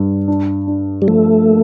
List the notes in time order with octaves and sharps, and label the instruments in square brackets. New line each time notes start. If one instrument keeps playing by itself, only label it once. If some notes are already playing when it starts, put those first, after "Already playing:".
Already playing: [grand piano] G2 G3
D4
D4
[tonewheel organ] G3
[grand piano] F3 [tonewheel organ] A3
[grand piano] A#3